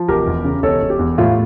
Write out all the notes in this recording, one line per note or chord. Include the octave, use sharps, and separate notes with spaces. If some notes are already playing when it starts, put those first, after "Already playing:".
Already playing: F3
E1 G4 A#4
E2
C#3
E1 A4 C#5
E1
G4
E2
A2 F4